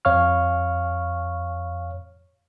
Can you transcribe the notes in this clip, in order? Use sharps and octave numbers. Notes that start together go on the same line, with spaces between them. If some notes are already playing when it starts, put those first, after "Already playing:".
F2 C#5 F5 C#6 F6